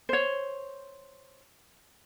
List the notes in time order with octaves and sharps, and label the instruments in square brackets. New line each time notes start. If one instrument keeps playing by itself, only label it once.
[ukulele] C5 C#5